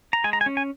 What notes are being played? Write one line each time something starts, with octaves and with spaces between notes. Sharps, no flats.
A#5
G#3 G#5
A#5
G#5
C#4
G#5